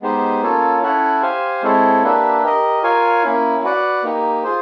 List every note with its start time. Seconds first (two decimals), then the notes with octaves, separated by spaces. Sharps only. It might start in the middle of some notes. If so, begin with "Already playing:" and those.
0.02 G#3 B3 D#4 G4 C5
0.42 A#3 C#4 F4 A4 C#5
0.82 C#4 E4 A4 C#5 F#5
1.22 G4 C5 F5 G#5
1.63 G#3 C4 E4 A4 C#5
2.02 A#3 D4 G4 B4 E5
2.43 G4 A#4 D#5
2.83 F4 A#4 C#5 F5 G#5
3.23 A#3 C#4 E4
3.64 F#4 B4 D5 F#5
4.03 A#3 D#4 G4
4.43 F4 G#4 C5